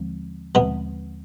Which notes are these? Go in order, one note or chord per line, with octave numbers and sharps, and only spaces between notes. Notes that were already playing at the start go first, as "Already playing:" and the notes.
Already playing: D#2 D3 F3 G#3 C4
D#2 B2 D3 F3 G#3 B3 C4